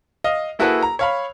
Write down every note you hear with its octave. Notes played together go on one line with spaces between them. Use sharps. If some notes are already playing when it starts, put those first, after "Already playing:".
D#5 F5
A#3 E4 F#4 G#4 A4 B4
A#5
C#5 F5 B5